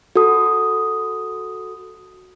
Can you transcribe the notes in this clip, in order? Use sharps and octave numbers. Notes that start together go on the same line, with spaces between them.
F#4 A4 D#6